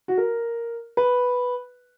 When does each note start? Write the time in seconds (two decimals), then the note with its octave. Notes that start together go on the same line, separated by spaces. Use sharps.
0.08 F#4
0.18 A#4
0.97 B4